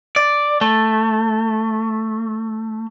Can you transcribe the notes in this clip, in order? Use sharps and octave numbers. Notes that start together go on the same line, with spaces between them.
D5
A3